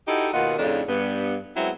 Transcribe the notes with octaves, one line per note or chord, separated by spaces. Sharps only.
D#4 E4 F#4 G4 A4 D#5
D#2 B2 D#3 F4 D#5 F#5
F2 A2 C#3 D4 D#4
G2 B3
F#3 G#3 B3 C4 E4